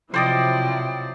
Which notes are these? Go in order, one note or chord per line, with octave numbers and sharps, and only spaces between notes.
C3 F3 F#3 E4 C5 D5 D#5 G5